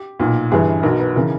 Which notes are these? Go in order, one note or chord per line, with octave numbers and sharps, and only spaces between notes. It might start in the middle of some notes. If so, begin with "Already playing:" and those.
Already playing: G4
B1 A#2
G1 G2 E3 G#4
B1 B2 A#4
B4
C#3 E3 A#4